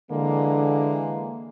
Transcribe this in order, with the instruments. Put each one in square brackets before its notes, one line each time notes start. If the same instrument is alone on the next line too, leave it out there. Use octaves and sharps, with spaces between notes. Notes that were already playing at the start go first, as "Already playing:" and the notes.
[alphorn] D3 [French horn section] E3 G#3 A#3